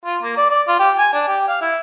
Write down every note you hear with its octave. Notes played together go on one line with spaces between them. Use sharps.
F4
A#3
D5
D5
F4
G4
G#5
D4
G4
F5
E4